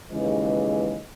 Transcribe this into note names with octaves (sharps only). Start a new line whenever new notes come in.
D#2 C#3 E3 G#3 B4 D#5